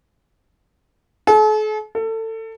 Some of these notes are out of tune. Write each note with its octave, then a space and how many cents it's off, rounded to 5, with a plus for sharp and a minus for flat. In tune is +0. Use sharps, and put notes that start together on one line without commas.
A4 -45
A4 +25